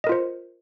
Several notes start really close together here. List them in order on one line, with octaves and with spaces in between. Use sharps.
D#5 A#4 F4 C5